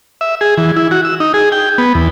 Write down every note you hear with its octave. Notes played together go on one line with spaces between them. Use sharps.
E5
G#4
E3
E4
F#4
E6
D#4
G#4
G5
B3
E2